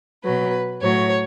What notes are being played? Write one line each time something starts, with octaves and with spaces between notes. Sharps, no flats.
B2 F#3 B4
A2 F#3 C#5